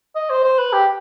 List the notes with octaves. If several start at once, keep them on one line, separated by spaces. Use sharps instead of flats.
D#5
C5
C5
B4
G4